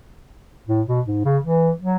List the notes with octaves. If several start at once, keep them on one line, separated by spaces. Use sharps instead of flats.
A2
B2
G#2
C#3
E3
F#3